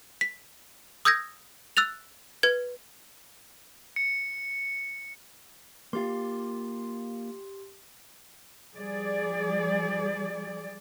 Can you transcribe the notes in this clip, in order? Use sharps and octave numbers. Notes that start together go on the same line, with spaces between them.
B6
D#6 E6 G6 G#6 A#6
E6 F#6 A6 F7
B4 G#6
C#7
A#3 F4 G4 C6
F3 G3 G#4 D5